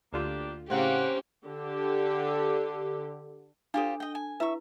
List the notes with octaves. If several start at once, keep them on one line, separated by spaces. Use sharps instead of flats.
D2 D3 A#3 D4 F4 G4
A2 C#3 A#3 C4 C#4 G4 F#5
D3 G4
D4 F4 G4 A4 C5
D#5 G5
G#5
E4 B4 E5 C#6